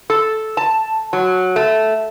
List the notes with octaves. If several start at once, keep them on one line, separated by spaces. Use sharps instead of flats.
A4
A5
F#3
A3